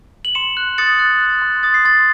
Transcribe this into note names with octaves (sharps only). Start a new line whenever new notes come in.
F#7
C6 C#7 E7
F#6
D#6 A6 C#7
F#6
F#6
C6
D#6 A6
C7
C6 A6